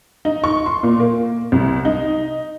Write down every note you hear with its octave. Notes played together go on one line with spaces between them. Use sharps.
D#4
C#6
C6
A#2
A#3
C2
D#4